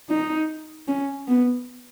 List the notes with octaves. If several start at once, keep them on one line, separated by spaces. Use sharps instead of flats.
D#4
C#4
B3